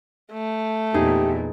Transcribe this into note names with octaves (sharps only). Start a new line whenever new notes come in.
A3
E2 A#2 D#4 G4 G#4